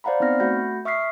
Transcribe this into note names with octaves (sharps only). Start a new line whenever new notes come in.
C5 D5 F5 F#5 A#5 B5
B3 C4 D#4 F6 A#6
A3 F#4 F#5 B5 G6 A#6
E5 C#6 D#6 F6 B6 C7